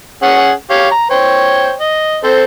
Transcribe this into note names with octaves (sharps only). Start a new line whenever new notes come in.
C#4 G#4 F#5
G4 C#5 F5
A#5
C5 C#5 G5
D#5
C4 A4 C5